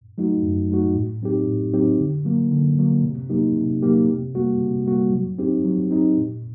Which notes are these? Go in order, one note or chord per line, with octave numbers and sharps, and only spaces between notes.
F#3 A3 D#4 F#4
F#2
F#3 A3 D#4 F#4
A2
F#3 C4 D#4 G4
A2
F#3 C4 D#4 G4
D3
F#3 A#3
D3
F#3 A#3
C3
F#3 A#3 D#4 G4
C3
F#3 A#3 D#4 G4
C3
G3 A#3 F#4
C3
G3 A#3 F#4
F#3
C4 D#4 G4
F#3
C4 D#4 G4
A#2